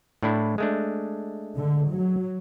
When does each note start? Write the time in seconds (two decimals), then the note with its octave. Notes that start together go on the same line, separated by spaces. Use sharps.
0.23 A2 D4 E4
0.58 G#3 A3 D4
1.56 D3
1.91 F#3